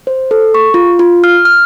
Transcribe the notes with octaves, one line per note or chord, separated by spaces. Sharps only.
C5
A4
C#6
F4
F4
F6
F6